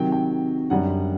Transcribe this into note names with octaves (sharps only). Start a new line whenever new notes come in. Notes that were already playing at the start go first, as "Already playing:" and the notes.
Already playing: C3 D#3 F#3 G5
G5
F#2 D3 G3 F#5